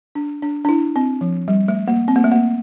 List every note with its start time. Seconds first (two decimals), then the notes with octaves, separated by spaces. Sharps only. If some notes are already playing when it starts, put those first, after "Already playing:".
0.15 D4
0.42 D4
0.65 D4
0.69 E4
0.96 C4
1.21 F3
1.48 G3
1.68 A3
1.88 A#3
2.08 C4
2.16 A#3
2.24 A3
2.32 A#3